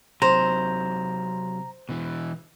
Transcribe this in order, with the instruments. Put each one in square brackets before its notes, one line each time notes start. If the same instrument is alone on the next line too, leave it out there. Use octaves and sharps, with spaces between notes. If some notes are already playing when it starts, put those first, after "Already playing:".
[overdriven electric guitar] C3 F#3 [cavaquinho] C5 [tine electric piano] A#5
[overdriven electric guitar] B2 E3